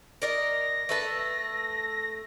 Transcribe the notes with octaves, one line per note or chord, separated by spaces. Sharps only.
A#4 D5 D#5 A#6
A3 B4 A5